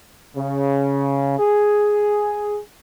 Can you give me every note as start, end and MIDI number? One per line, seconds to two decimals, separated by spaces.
0.37 1.38 49
1.39 2.59 68